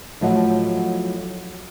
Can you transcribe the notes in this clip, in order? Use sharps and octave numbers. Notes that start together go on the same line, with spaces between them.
A2 F3 F#3 D#5 F#5